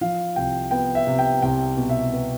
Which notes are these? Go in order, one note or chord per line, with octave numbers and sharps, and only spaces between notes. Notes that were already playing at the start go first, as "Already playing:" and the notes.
F3 F5
C2 G5
B3 G5
E5
C3
G5
C2 G5
B2
E5
B3